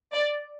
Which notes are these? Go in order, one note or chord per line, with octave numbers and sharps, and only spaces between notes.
D5